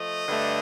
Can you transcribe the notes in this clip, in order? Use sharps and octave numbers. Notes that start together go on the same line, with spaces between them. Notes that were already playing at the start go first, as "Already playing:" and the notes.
Already playing: F3 A3 D#5
G2 D3 A3